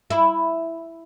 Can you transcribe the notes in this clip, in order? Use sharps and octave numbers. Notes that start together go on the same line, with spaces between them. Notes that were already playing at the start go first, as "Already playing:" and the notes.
E4